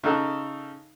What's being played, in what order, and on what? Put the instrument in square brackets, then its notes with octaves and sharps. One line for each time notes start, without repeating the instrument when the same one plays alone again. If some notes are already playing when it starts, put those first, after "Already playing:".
[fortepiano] C#3 D#4 A4 F#6